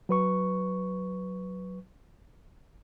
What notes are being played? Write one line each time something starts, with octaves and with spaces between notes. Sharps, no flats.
F#3 B4 C#6